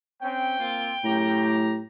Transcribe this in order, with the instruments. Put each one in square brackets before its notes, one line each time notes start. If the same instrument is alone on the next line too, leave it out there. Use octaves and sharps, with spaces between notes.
[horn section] C4 C#4 [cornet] G5
[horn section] A#3 C4 F4
[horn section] F#2 G4 A#5 [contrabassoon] A2